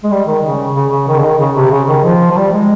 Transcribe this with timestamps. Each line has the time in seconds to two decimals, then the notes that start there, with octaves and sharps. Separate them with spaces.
0.04 G#3
0.11 G3
0.27 D#3
0.44 C#3
0.76 C#3
0.92 C#3
1.08 D#3
1.18 C#3
1.24 D#3
1.40 C#3
1.56 C3
1.71 C#3
1.88 D#3
2.04 F3
2.31 F3
2.36 G3
2.52 G#3